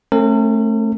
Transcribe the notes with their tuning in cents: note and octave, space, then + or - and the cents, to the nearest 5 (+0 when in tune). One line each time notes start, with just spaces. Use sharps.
A3 +0 C#4 -45 A#4 -45